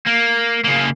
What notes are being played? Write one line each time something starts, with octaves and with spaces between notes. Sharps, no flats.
A#3
C#3 A#3